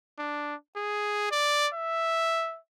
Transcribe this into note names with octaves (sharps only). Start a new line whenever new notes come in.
D4
G#4
D5
E5